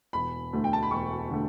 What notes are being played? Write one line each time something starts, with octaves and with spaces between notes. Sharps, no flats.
E1 B5
D2 D3 A3
G5
A5
B5
E1 C#6
D3 A3